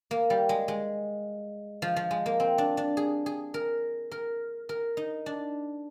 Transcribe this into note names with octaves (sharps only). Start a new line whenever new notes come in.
A#3
G3
G#3
G#3
F3
F3
G#3
A#3
C4
D4
D4
G#4
G#4
A#4
A#4
A#4
D#4
D4